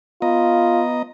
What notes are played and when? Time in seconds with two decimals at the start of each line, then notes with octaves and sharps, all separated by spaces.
0.22 B3 F4 D#5 A#5